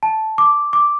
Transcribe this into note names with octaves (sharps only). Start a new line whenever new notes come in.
A5
D6
D6